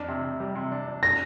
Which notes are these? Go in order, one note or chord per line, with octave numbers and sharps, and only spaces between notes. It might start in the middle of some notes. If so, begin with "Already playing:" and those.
Already playing: F2 D4
C3
C3
G3
C3
D4
D4
A#6